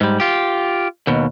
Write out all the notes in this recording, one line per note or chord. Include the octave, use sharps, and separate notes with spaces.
G#2 G3
F4 G4
D#2 B2